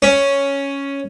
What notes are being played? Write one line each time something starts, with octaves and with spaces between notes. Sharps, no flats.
C#4